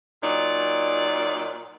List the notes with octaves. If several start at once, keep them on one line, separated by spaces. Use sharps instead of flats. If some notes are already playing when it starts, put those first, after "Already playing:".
A#2 F#3 D#4 D5